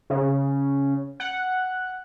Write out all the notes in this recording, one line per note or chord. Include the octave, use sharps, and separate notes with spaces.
C#3
F#5